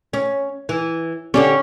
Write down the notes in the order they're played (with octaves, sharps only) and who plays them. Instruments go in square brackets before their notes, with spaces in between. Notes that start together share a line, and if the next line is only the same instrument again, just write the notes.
[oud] C#4
E3
[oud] D3 D4 G4 [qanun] C#4